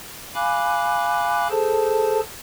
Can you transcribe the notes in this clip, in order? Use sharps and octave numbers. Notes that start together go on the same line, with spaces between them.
F5 G#5 B5 D6 F#6
G#4 A4 C5 A5